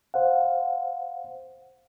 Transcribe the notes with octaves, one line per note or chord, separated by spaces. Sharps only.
C5 F5 F#5